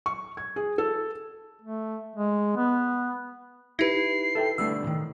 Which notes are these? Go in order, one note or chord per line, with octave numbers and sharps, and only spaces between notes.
C#6
G#6
G#4
A4
A3
G#3
B3
D#4 E4 G4 B4 C7
A4 E5 G5
D3 G3 A3 E6
E2 A2 D#3